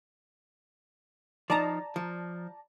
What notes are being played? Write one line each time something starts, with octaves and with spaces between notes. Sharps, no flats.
F3 D#4 D5 A5 A#5
F3